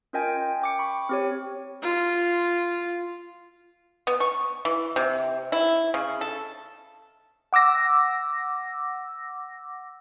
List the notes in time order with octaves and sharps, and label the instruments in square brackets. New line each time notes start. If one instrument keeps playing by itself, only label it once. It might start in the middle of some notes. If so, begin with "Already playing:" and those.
[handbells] C#4 F4 A#4 D#5 G5 G#5
G5 D6 C#7
B5 C#6
C4 G4 C#5
[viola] F4
[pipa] B3
C#6
E3
C3
E4
C#3
A4
[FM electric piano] F#5 D6 E6 A#6